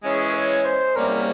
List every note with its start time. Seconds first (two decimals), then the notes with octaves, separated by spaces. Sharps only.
0.03 E3 G#3 C#4 G#4
0.34 C#5
0.65 C5
0.96 E2 C3 G3 A#3 C#4 A#4